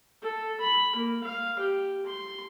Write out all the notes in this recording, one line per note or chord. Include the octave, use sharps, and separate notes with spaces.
A4
B5
A#3
F5
G4
C6